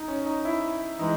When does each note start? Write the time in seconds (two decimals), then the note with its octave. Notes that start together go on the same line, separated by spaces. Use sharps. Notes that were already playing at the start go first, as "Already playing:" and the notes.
Already playing: D#4
0.08 C#4
0.26 D#4
0.45 E4
0.99 E3 G#3 D#4